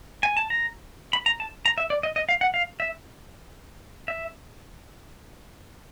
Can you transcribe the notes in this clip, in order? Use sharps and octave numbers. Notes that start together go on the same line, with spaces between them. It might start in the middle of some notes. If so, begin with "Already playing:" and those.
G#5
A5
A#5
B5
A#5
A5
A#5
E5
D5
D#5
D#5
F5
F#5
F5
E5
E5